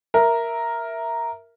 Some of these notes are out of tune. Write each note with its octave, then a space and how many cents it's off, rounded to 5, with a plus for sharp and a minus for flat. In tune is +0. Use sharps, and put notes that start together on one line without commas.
A#4 +0 E5 +0